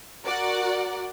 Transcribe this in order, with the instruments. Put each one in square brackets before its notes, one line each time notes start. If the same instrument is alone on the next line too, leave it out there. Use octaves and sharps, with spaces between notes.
[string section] F#4 A#4 D5 F#5